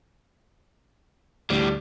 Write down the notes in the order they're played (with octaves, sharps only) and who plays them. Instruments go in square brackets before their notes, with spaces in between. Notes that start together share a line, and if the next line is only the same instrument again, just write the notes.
[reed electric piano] D2 [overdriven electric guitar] A2 G3